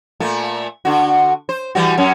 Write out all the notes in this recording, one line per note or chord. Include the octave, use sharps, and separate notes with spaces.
A#2 A3
D3 F#4
C5
E3 G3 F#4
F#2 C#4